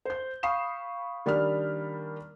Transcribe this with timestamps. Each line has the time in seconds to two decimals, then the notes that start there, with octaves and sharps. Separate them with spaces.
0.05 C5 G6
0.43 F5 B5 C#6 D#6 C7 E7
1.26 D#3 G3 A#3 D4 B5 F6